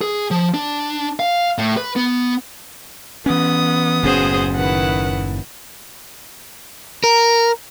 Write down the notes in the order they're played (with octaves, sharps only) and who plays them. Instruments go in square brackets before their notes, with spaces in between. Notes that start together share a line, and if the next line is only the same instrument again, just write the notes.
[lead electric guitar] G#4
F3
D4
F5
A2
B4
B3
[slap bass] E3 C#4 [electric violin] B3 D#6
[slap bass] F#1 A2 C#4 [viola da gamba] F#4 G#4 C5
[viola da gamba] D#3 E4 [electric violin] B4 F#5
[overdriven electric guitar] A#4